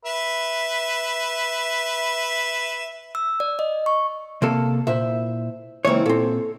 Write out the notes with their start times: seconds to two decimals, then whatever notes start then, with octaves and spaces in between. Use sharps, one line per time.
0.05 B4 E5
3.15 E6
3.40 D5
3.59 D#5
3.86 C#6
4.42 C3 A#3 A4
4.87 A#2 E4 C5 E5
5.85 C#2 E3 A#3 C4 C#5
6.06 A#2 C4 A4